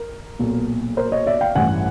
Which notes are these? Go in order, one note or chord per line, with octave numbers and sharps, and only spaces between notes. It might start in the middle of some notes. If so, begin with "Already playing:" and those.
Already playing: A#4
B1 A#2
A#4 C5
C#5 D#5
D5 E5
F5 G5
A1 G2 E3 F#5 G#5